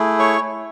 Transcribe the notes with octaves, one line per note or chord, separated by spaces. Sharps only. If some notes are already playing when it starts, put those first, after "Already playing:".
Already playing: A3 E4 G#4
C#5 C#6